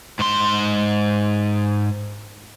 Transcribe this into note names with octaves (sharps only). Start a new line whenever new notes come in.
G#2 C6